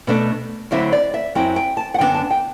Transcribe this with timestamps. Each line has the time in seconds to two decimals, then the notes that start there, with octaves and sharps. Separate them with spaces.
0.07 B2 A3 D4
0.71 D2 D3 F#3 C4 E4 E5
0.92 D5
1.14 E5
1.35 F#2 F#3 C4 E4 G5
1.56 G5
1.77 A5
1.94 F#5
1.98 F#2 D3 F#3 B3 D4 G5
2.14 A5
2.31 G5